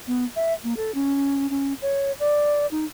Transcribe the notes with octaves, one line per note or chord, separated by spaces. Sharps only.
B3
E5
A#3
A4
C#4
C#4
C#5
D5
D#4